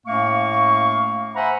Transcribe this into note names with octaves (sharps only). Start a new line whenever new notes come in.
A2 A3 A#3 C#4 F5 C#6
C5 E5 F#5 G#5 A#5 B5